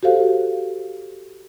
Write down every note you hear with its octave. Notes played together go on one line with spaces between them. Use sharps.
F#4 G4 A4 C5 F5